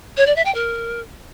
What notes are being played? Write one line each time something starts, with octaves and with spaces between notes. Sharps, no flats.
C#5
D5
E5
G5
A#4